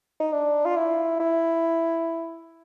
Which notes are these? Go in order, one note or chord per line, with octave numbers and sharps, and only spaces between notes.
D#4
D4
F4
E4
E4